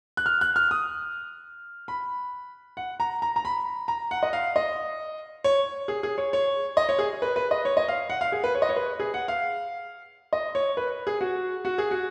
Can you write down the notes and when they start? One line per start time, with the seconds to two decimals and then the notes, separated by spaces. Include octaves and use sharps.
0.17 F#6
0.26 F6
0.41 F#6
0.56 F6
0.71 D#6
1.88 B5
2.77 F#5
3.00 A#5
3.22 A#5
3.36 A#5
3.45 B5
3.88 A#5
4.11 F#5
4.23 D#5
4.33 F5
4.56 D#5
5.44 C#5
5.88 G#4
6.03 G#4
6.18 C#5
6.33 C#5
6.77 D#5
6.89 C#5
6.99 G#4
7.22 B4
7.36 B4
7.51 D#5
7.65 C#5
7.77 D#5
7.88 F5
8.10 F#5
8.21 F5
8.32 G#4
8.44 B4
8.55 C#5
8.62 D#5
8.69 C#5
8.76 B4
9.00 G#4
9.14 F#5
9.28 F5
10.33 D#5
10.55 C#5
10.77 B4
11.07 G#4
11.21 F#4
11.65 F#4
11.78 G#4
11.91 F#4